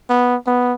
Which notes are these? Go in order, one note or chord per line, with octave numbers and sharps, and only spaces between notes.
B3
B3